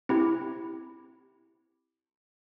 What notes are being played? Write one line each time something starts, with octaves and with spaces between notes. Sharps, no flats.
C4 E4 G4